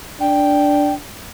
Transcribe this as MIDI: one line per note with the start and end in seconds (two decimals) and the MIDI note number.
0.20 0.95 62
0.20 0.94 79